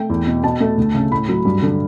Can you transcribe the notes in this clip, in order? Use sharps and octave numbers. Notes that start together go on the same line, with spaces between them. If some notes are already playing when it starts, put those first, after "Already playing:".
Already playing: A3 G5
E2
B2
B2 A5
A3
D2
C#3
A2 B5
F#3
G2
D3